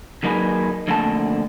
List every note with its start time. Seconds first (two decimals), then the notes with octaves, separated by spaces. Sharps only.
0.23 D#2 F#3 A#3 D#4 G#4 B4
0.87 F2 D3 A3 A#3 F#5 A5